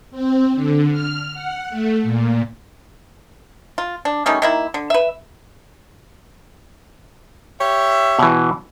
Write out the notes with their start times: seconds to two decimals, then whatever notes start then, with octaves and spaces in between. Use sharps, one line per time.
0.11 C4
0.53 D3
0.91 F6
1.33 F#5
1.69 A3
2.03 A#2
3.78 F4
4.05 D4
4.26 D#3 G3 A3 C#4
4.42 D#3 A#3 E4
4.74 D3
4.90 B4 E5
7.60 G4 C#5 E5
8.19 B2 E3